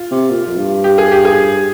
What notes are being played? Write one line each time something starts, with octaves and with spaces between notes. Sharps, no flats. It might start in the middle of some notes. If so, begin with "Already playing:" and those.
Already playing: F4
C3
A#2
F2
G2
G4
G#4
G4
G#4